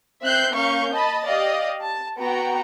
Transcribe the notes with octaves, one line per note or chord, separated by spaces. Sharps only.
C4 E5 F#6 G6 C7
A#3 C#4 F5 C#6 G6
D#5 A5 B5 A6
G4 D5 D#5 F5
A5
B3 F#4 G5 A#5